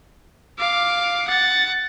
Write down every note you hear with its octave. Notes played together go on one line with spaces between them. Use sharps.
F5 D6
F#5 A6